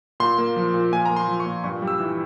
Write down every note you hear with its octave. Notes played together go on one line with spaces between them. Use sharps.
A#2 C6
A#3
F3
A#2
A#2 G#5
A#3 A#5
C6
F3
C#6
A#2
G2 C#6
G3
E6
E3